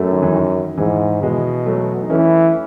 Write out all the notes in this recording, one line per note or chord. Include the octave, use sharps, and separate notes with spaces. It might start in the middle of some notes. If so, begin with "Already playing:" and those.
Already playing: F#2 F#3 A3
D#3
E3
D#3
G#2 E3
B2 E3 G#3
F#3 A3
D#4
E3 A3 C#4